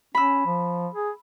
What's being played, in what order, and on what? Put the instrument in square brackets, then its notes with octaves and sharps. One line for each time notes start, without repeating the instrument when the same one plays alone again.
[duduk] C#4 [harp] B5 E6
[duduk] F3
G#4